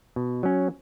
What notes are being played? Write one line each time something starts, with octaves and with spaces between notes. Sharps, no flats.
B2
F#3 C#4